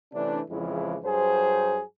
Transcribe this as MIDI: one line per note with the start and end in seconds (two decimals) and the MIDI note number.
0.13 0.40 48
0.13 0.40 52
0.13 0.40 57
0.13 0.40 61
0.13 0.40 62
0.49 0.96 41
0.49 0.96 49
0.49 0.96 52
0.49 0.96 53
0.49 0.96 56
0.49 0.96 64
1.04 1.80 43
1.04 1.80 54
1.04 1.80 68
1.04 1.80 72